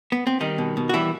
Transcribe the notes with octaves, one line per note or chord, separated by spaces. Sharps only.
B3
C4
D#3 G3 D#4
B2
B2
F#4
E3 G3 E4